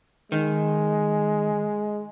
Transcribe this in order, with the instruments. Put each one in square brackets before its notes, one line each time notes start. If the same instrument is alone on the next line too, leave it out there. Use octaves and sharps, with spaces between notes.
[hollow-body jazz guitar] D#3 [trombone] G#3